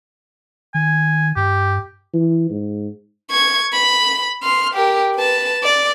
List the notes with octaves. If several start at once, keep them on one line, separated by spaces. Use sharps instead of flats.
D#3 G#5
G2 G4
E3
G#2
C#6 G#6
B5
C6 F6
G4 A#4
B4 A5
D5